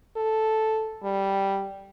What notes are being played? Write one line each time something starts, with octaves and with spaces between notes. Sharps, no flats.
A4
G3